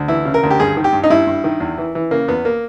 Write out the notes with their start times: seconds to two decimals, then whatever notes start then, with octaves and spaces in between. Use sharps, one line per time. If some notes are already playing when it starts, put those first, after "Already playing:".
Already playing: D2
0.08 E3 E4
0.25 C#3
0.34 A#4
0.43 D2
0.51 G4
0.60 G2 G#4
0.77 D#3
0.84 G4
0.93 G2
1.04 D#4
1.10 G2 E4
1.27 G2
1.44 D#3
1.60 E2
1.78 E3
1.95 E3
2.11 C#3 A#3
2.28 E2 B3
2.45 A#3